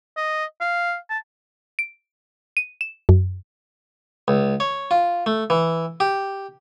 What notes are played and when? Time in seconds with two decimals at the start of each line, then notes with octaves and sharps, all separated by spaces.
0.17 D#5
0.61 F5
1.10 A5
1.79 D7
2.57 D#7
2.81 E7
3.09 F#2
4.28 C#2
4.60 C#5
4.91 F4
5.26 A3
5.50 E3
6.00 G4